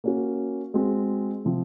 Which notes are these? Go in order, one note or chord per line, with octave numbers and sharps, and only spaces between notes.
A#3 C#4 F#4
G#3 C4 F#4
C3 F3 C4